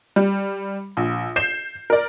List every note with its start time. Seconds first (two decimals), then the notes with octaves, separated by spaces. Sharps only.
0.16 G3
0.97 A#1
1.36 G6 C7 E7
1.90 A#4 D5